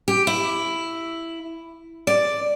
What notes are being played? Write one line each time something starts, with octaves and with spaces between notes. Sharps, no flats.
G4
E4
D5